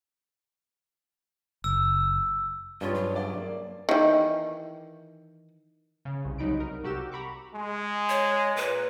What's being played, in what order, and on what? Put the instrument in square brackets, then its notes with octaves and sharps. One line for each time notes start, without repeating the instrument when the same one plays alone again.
[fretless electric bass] F#1 [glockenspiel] E6
[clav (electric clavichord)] G2 C#4 G#4 [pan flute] F4
[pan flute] F#3
[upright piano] D5 D6
A#3
[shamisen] D#3 E3
[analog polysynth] C#3
C2
C2 F#3 D#4 B5 D7
A#4
C2 F#4 G4 E6 E7
A#5 B5 C#6 D6
[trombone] G#3
[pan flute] C#5
[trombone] A#2 [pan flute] B4